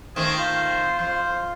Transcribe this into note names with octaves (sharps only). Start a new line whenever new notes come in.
D#3 A3 C4 G#4
F4 C5
F2 C5